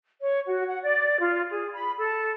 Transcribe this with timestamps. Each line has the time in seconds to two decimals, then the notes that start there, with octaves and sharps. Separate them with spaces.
0.21 C#5
0.45 F#4
0.68 F#5
0.82 D5
1.19 F4
1.50 G#4
1.73 B5
1.99 A4